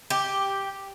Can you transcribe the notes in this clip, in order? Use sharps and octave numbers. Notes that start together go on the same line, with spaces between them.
G4